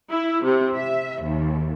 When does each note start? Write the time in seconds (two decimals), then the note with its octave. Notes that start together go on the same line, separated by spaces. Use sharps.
0.10 E4
0.43 C3
0.76 E5
1.23 D#2